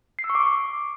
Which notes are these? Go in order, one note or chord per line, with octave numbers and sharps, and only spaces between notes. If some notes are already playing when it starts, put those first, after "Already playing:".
C7
E6
C#6
D6